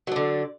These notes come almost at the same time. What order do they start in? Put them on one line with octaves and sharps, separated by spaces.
F#3 D4 D3